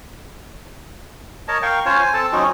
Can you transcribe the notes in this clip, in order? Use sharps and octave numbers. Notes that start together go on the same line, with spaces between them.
A#4 C#5 D#5 A5
A#4 F5 G5 C#6
C#4 F4 C5 C#5
C5 G#5
C4 A4 A5
F#3 C4 C#4 D#4